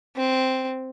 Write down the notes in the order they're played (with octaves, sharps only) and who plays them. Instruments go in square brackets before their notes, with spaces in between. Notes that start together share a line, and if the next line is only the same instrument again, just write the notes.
[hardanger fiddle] C4